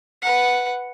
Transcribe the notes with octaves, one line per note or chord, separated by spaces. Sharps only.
B4 F#5